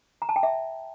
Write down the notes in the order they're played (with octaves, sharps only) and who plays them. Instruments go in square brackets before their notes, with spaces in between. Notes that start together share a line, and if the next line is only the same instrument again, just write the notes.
[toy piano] A#5
A5
G5
E5